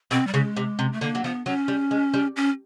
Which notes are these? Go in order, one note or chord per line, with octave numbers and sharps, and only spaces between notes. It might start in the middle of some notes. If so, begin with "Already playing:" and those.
B2 C4
G3
C#3 G#3
C3
C3
A3
D3 A#3
F#3
F3 B3
F#3 C#4
G3
G#3
G3
C#4